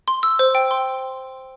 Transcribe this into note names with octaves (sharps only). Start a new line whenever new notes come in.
C6
E6
C5
G5
C6